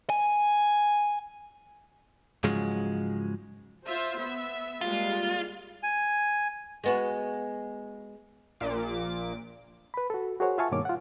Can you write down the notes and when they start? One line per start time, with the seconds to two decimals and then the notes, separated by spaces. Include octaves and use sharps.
0.10 G#5
2.44 G#2 C#3 F3 F#3 G#3
3.86 F4 C5 E5
4.18 B3 E5
4.81 G3 G#3 A#3 F4
5.83 G#5
6.84 G#3 B3 F#4
8.60 A#1 A#2 D6
9.94 B4 B5
10.10 F#4 A4
10.40 F#4 G#4 A#4 C5 C#5 F#5
10.58 F4 E5 F5 G#5 A5 C#6
10.72 G2 B2 D#3 A#3 C#5 D6
10.85 F4 F#5